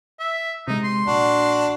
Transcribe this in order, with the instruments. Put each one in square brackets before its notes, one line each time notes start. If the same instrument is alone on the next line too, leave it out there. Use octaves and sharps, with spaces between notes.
[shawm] E5
[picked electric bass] C3 G#3 [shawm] D#4
[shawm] C6
[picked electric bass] A#1 [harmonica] D4 F#4